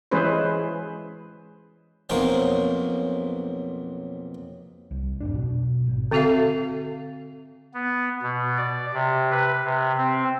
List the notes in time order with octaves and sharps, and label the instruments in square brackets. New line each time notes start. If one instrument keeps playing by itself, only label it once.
[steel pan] E3 G#3 C#4 G#4 B4 C5
[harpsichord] B1 F2 A#3 A#4 C5 C#5
[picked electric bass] C2
F2 G#2 D4
B1 B2
G#1
[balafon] D3 C4 F#4 A4 E5 F5
[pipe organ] B3
B2
D5
C3
B4
C3
C4